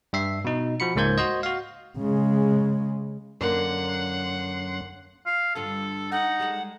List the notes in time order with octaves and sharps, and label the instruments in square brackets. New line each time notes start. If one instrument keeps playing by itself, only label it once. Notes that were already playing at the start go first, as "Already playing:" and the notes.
[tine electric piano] G2 E5 C7
B2 D#4
F3 F#4 B5 C#7
C#2 G#2 A#3 C5 G6 G#6
F#4 C5 D#5
F#4 F5
[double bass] C#3 G#3
[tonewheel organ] F#2 C#4 C6 [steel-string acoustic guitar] D3 A#3 [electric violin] F#5
[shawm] F5
[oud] G2 D3 F4 [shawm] A4
[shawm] D#4 [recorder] F#5
[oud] G3 G#3 A4